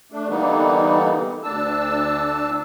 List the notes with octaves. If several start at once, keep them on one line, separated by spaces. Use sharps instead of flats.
A3 D4
D3 E3 G3 A#3 B3 D#4
D2 D4 A5 E6